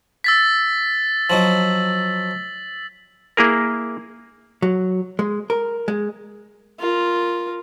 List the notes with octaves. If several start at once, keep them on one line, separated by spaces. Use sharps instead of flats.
E6 A6 B6
F3 F#3 D#4 F#7
A#3 E4 G#4 A#4
F#3
G#3
A#4
G#3
F4 A#4